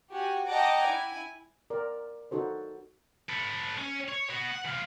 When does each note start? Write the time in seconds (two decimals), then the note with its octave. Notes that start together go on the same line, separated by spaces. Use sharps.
0.11 F#4 G4 G#5
0.48 D#5 F#5 G5 A5 A#5 D6
0.84 E4 G#5
1.70 A#4 D5
2.31 D#4 F#4 A4 C5
3.29 A4 B4
3.78 C#4
4.08 C#5
4.30 B3 F#4
4.52 F#5
4.65 E3 F4